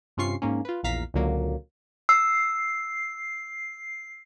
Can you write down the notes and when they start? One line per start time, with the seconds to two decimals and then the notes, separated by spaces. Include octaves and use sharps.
0.17 G2 C3 C#4 F4 C#6 C7
0.42 G#2 A#3 C#4
0.65 F4 B4
0.83 A#1 E2 A#2 F5 A#5 B6
1.14 C#2 A#2 D3 F#3 A#3
2.09 E6 C7